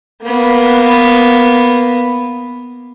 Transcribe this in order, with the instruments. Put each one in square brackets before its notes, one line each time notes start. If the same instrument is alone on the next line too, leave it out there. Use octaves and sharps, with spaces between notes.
[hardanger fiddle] A#3 B3